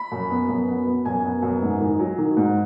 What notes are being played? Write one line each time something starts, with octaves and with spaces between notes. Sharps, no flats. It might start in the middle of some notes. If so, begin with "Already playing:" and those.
Already playing: B5
F#2
B3
F#2
B3
B3
F#2 G#5
B3
F#2
G#2
D#3
F#3
D#3
G#2